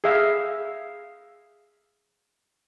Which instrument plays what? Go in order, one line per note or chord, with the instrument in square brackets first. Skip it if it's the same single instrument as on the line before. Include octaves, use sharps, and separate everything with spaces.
[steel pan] G#4 E5 F5